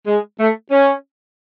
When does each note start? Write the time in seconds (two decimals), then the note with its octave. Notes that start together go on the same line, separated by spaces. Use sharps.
0.07 G#3
0.39 A3
0.71 C#4